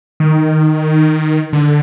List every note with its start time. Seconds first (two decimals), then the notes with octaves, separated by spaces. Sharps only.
0.20 D#3
1.53 D3